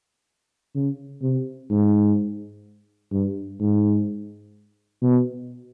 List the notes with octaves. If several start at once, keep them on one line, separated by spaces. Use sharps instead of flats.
C#3
C3
G#2
G2
G#2
B2